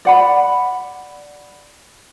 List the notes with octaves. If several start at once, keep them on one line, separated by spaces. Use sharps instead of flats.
D5 F#5 B5